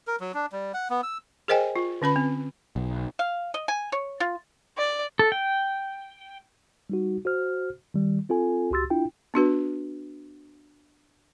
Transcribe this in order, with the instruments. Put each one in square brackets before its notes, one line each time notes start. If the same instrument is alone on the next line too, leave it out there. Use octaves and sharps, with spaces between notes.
[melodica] A#4
F#3
D4
G3
F#5
B3
E6
[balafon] G#4 A#4 C5 D#5 G5 G#5
F4
D3 C#4 B4 B5
C4
[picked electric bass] B1
[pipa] F5
D#5
G#5
C#5
F4
[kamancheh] D5
[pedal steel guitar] A4
G5
[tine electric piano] G3 D#4 F#4
F#4 C5 F6
D#3 G3
C4 F4 A4 G#5
C#2 F#4 G4 C6 E6 A6
D4 E4 F4 G5
[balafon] B3 D4 F#4 B4